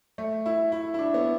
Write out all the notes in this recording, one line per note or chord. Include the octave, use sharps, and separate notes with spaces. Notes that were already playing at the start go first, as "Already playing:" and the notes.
A3
E4
E4
E4
D4
B3